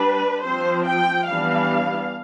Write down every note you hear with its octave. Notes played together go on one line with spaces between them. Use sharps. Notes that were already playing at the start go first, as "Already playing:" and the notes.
Already playing: G3 D4 B4
F3 C4 C5
G5
E3 G3 B3 D4 F5